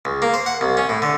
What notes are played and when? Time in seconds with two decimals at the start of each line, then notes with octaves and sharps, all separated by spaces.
0.05 C#2
0.22 A#3
0.34 C5
0.46 F#5
0.61 C2
0.77 C#4
0.89 A2
1.02 D3